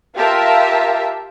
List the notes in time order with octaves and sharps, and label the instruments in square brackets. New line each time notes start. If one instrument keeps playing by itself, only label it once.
[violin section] F4 G4 A#4 E5 A5